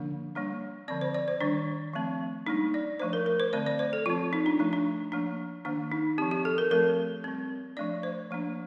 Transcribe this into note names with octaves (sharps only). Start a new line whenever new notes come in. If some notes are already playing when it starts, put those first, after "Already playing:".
Already playing: D3 F3 A#3 D4
G3 A#3 D4
D3 F3 C4 D5
C5
D5
C5
D#3 G3 D4
F3 A3 C4
G3 A#3 D4 D#4
D5
F3 A3 D4 C5
A#4
A#4
C5
D3 A3 C4 D5
D5
C5
A4
F3 C4 F4
D#4
D4
F3 A3 D4
D4
F3 A#3 D4
D#3 A#3 D4
D#4
F3 C4 G4
G4
A4
A#4
F3 A3 C4 A#4
G3 C4
F3 A3 D4 D5
C5
F3 A#3 D4